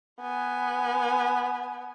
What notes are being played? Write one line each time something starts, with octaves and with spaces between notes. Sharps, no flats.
B3 G#5